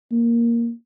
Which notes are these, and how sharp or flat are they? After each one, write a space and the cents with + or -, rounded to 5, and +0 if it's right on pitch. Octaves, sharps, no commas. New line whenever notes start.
A#3 +5